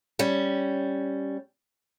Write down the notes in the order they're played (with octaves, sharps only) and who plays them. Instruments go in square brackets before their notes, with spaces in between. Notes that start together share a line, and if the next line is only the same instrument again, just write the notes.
[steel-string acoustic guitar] G3 C#4